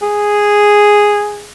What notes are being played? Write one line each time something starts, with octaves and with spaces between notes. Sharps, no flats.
G#4